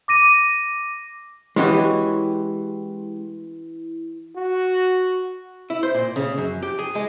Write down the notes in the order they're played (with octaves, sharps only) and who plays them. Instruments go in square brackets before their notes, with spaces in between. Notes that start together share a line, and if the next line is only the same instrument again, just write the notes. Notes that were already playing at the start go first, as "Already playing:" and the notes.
[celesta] D6 A#6 D#7
[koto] E3 F#4 [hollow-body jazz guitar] G#3 C#4 G4 [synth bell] E4
[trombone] F#4
[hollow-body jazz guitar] E4
C5
A#2
C#3
F#2
G4
G#4
G#3